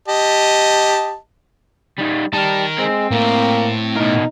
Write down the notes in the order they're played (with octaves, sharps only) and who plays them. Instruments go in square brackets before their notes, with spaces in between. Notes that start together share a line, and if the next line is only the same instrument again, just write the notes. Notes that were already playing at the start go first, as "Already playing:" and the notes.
[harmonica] G4 D#5 A5
[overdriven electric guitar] G3 D#4
[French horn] G3 [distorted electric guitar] D#4 A#4 [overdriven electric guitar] A5
[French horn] G#3 [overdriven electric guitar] C4
[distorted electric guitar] A2 [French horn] A#3
[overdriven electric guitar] B2 A#4 [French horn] D#4